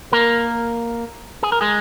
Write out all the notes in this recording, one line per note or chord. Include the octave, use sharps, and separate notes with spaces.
A#3 A#4
G#4
A#4
G#3 G#4